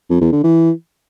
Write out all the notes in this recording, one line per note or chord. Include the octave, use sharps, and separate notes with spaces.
F2
E2
D3
E3